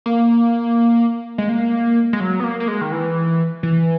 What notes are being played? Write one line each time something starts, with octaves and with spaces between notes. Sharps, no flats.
A#3
G#3
A#3
G#3
F#3
B3
A#3
A#3
G#3
D#3
E3
E3